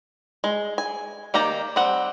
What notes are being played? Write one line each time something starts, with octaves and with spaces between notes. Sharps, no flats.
G#3
G#5
D#3 A#3 G4 A#5
G3 C4 F#5